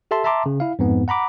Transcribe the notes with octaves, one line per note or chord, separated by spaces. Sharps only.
G4 A4 E5 A5 C6
E5 A5 A#5 C6 D6
C#3
E4 F5
F2 G#2 B3
F#5 A#5 B5 D6